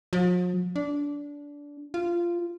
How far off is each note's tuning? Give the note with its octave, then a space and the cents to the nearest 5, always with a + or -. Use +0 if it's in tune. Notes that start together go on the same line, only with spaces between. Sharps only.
F3 +45
D4 -20
F4 -15